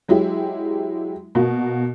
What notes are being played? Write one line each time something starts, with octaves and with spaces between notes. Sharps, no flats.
F#3 G#3 E4 G4
B2 A#3 F#4